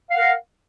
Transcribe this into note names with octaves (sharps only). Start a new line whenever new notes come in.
A#4 F5 F#5